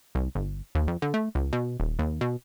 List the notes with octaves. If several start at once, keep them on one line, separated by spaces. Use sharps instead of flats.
C2
G1
D#2
F2
D3
A3
C#2
B2
D#1
D#2
B2